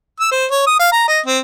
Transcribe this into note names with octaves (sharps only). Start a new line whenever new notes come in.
E6
C5
C#5
D#6
F5
A#5
D#5
C4